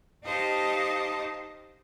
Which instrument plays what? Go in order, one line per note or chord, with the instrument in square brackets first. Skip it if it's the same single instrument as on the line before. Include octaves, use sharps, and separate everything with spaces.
[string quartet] D#4 G4 C5 D#5 F5 A5